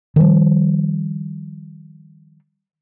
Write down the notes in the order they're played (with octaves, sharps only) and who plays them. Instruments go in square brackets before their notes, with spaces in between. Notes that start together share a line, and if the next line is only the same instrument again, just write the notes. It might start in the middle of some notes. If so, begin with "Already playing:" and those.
[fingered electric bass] D#3 F3 G3